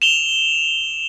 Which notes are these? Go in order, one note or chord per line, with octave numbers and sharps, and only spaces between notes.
E7 F7 G7